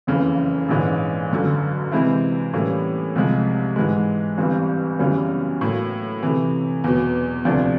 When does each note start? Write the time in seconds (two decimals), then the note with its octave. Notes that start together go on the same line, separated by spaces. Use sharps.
0.07 F#1 F2 C#3 E3
0.69 A#1 G#2 E3 G#3 C#4
1.31 G1 F#2 D3
1.91 C3 E3 G#3 C4 E4
2.53 A2 E3 G3 A#3 C#4
3.15 C2 C3 F3 G#3
3.76 G#2 E3 G#3
4.38 G1 G2 E3 G3 C4
4.99 F#2 C#3 E3 G3 B3
5.61 A2 F#3 A#3
6.23 C3 E3 A3
6.84 E2 B2 F#3
7.45 D2 C3 F3 A3 D4